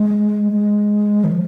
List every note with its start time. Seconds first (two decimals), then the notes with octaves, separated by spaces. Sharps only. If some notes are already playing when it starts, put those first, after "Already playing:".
Already playing: G#3
0.52 G#3
1.24 D#3
1.32 F3